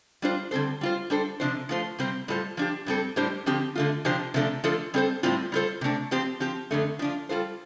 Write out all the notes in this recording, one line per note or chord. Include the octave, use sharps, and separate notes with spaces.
G3 D4 F4 C5
D3 G3 C4 A4 C5
G3 F4 C5
G3 D4 A4 C5
C3 F3 D4 F4 C5
F3 A3 F4 C5
C3 G3 C4 G4 C5
A2 G3 F4 A4 C5
F3 D4 G4
G2 G3 C4 A4
A2 G3 D4 G4 C5
D3 F3 C4 G4
D3 A3 F4
C3 F3 D4 G4 C5
C3 F3 A3 D4
F3 A3 D4 F4 A4
G3 C4 A4 C5
A2 G3 C4 F4
G3 F4 A4 C5
C3 A3 D4
F3 C4 G4 C5
F3 C4 G4
F2 D3 A3
F3 D4 F4
G3 F4 A4 C5